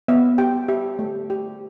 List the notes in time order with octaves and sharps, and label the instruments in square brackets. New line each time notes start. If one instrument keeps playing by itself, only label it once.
[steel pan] B3 E5
G4 G5
G4 E5
A3
G4